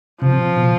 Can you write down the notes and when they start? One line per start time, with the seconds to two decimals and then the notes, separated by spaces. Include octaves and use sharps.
0.21 C3 F3
0.57 B2